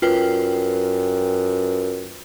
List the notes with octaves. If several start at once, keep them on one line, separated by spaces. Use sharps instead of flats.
F#2 F4 B4 G5